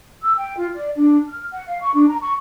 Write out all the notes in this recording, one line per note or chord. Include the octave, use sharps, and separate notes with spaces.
E6
G5
F4
D5
D4
F6
F#5
F5
C#6
D4
A#5
C#6